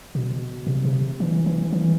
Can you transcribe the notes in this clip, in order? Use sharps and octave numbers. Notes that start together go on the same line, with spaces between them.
B2
C3
C3
E3
E3
E3